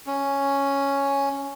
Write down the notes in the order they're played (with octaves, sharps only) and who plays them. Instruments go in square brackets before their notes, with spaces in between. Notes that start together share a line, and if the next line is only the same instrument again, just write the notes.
[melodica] C#4